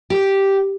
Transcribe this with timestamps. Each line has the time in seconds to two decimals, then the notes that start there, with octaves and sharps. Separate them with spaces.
0.10 G4